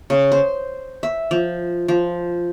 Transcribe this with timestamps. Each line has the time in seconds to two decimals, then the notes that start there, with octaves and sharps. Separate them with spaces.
0.10 C#3
0.32 C5
1.03 E5
1.31 F3
1.88 F3